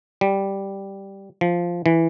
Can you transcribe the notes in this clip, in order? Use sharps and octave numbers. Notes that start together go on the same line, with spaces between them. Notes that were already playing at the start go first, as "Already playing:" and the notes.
G3
F3
E3